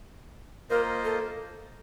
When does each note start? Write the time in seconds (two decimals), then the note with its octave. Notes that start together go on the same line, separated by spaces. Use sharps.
0.70 A#3 F4 A#4 C5 D#5
1.05 A4